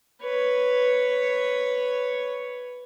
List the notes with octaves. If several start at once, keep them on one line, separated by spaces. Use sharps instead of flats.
B4 C#5